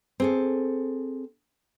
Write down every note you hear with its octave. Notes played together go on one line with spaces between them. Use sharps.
C4 G#4 A4